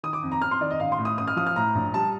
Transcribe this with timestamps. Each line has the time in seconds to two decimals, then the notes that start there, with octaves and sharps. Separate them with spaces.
0.03 D#3 D#6
0.13 D6
0.23 F2
0.32 A#5
0.42 F2 F6
0.51 C6
0.61 D#3 D5
0.70 D#5
0.80 A1 F5
0.92 C6
0.99 A2
1.05 D#6
1.18 A1 D#6
1.27 F6
1.37 F3 D#6
1.46 F6
1.56 A2 A#5
1.75 A#1
1.94 G3 A5